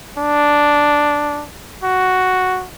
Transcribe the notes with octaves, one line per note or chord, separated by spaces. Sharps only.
D4
F#4